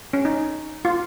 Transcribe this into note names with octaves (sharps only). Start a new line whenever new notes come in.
C#4
D#4
F4